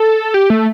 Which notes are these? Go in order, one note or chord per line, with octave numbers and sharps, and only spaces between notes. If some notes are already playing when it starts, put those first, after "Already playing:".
Already playing: A4
G4
A3